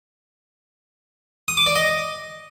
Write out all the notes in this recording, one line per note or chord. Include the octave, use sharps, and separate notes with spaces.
D#6
D6
D5
D#5